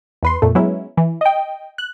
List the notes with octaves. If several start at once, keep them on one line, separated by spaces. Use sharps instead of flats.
E2 B4 C6
F2 A#2 A3
F#3 G#3 B3 C#4 E4
E3
D#5 G5
F#6